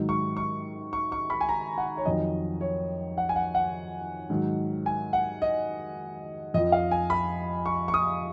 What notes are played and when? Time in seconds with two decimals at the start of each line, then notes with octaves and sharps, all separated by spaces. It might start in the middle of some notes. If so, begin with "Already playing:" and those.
Already playing: G#2 D#3 F#3
0.09 C#6
0.37 C#6
0.93 C#6
1.12 C#6
1.30 B5
1.41 G#5
1.49 A#5
1.78 F#5
1.97 C#5
2.05 F2 D#3 F#3 D#5
2.61 C#5
3.18 F#5
3.29 G#5
3.36 F#5
3.55 F#5
4.30 G#2 D#3 F#3
4.86 G#5
5.13 F#5
5.42 D#5
6.54 F2 F3 D#5
6.72 F5
6.91 G#5
7.10 B5
7.66 C#6
7.88 C#6
7.94 D#6